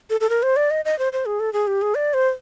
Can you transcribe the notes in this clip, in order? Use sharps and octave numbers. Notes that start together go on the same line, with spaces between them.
A4
A4
A#4
C5
D5
D#5
D#5
C5
C5
G#4
A4
G#4
G4
G#4
D5
C5